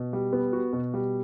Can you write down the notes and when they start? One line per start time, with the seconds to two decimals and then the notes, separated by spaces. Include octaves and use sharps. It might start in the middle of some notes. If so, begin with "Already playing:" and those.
Already playing: B2
0.13 G3
0.33 B3
0.53 F#4
0.73 B2
0.94 G3